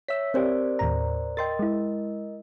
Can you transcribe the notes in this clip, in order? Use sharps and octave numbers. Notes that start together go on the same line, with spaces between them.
C#5 E5 E6 B6
C4 G4 A#4 C5 D5
D#2 A2 A#5
A#4 D#5 G5 C6 A6
G#3 E4